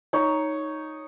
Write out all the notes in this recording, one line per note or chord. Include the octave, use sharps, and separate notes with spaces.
D#4 C#5